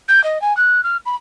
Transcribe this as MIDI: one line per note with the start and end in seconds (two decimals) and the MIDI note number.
0.08 0.23 91
0.24 0.41 75
0.41 0.55 80
0.57 0.83 90
0.83 0.97 89
1.06 1.15 83